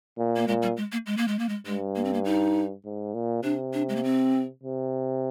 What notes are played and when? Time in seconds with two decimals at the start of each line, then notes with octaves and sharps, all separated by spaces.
0.18 A#2
0.36 A#3
0.47 A#2 G#3
0.62 G3
0.77 G#3
0.92 A#3
1.06 G#3
1.17 A#3
1.28 G#3
1.39 A#3
1.49 G#3
1.66 G2 G#3
1.96 A#3
2.04 C4
2.13 A#3
2.25 D#4
2.85 G#2
3.14 A#2
3.44 C3 D4
3.73 D4
3.89 G#3
3.96 A#3
4.04 C4
4.63 C3